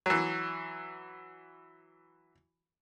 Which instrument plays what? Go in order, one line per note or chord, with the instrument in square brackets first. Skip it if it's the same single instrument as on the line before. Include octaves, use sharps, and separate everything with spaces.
[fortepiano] E3 F#3